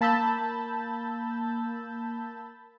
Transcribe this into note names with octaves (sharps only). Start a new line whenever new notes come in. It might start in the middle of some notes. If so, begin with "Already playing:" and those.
A#3 A5 B5 E6 G6 A6